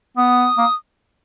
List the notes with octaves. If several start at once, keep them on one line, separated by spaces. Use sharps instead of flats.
B3 D#6
A#3